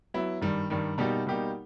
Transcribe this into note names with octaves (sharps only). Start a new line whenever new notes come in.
F#3 B3 E4
G2 D#3 G3
G2 D#3 G3
B2 G3 A#3 D#4 G4
B2 G3 A#3 D#4 G4